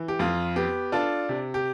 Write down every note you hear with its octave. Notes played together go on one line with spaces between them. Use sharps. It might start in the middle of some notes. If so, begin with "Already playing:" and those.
Already playing: E3
G4
F2 F4
B3 G4
D4 F4 A4
C3
G4